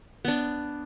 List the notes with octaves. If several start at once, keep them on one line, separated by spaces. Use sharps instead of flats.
B3 D4